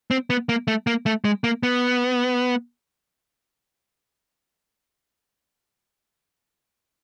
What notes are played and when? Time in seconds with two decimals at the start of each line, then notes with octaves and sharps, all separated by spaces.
0.11 C4
0.30 B3
0.49 A#3
0.68 A3
0.87 A#3
1.06 A3
1.25 G#3
1.44 A#3
1.63 B3